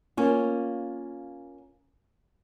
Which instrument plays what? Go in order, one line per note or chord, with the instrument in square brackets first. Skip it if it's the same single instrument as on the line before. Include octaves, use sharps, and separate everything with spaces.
[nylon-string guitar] A#3 C#4 F4